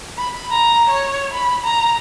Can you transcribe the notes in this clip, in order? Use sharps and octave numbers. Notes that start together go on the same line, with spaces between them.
B5
A#5
C#5
B5
A#5